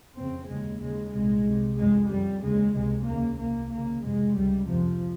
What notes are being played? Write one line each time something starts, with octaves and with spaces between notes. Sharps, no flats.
F2 C#3 C4
D#2 C#3 G#3
D#2 C#3 G#3
C2 A#2 G#3
C2 C3
F2 C#3 G#3
F2 C#3 G3
D#2 C#3 G#3
C#2 C3 G#3
D#2 C#3 A#3
C2 C3 A#3
D#2 C#3 A#3
F2 C3 G#3
C#2 C#3 G3
F2 C3 F3